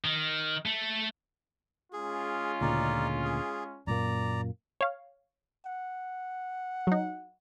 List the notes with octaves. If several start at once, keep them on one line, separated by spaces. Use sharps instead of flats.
D#3
A3
G#3 C#4 F4 G#4
D2 A#2 C#3 D#4 D5
G#4
F#2 A#2 A#3 D5 A#5
C#5 F5
F#5
F#3 D#4